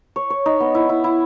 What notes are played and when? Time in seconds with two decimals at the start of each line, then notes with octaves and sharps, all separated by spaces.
0.16 C#5
0.30 C#5
0.46 D#4
0.60 B3
0.75 E4
0.89 E4
1.04 E4